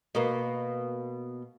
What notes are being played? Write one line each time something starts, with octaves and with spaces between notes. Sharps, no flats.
B2 A#3